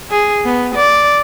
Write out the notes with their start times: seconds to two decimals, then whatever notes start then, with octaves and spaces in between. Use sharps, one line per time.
0.11 G#4
0.45 B3
0.75 D5